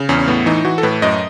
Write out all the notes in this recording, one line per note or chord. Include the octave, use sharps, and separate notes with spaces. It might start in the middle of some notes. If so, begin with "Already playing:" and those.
Already playing: C#3
E2 C#4
C#4
A2 B3
E3 D#4
E3 F#4
A4
A2 B4
F#2 D#5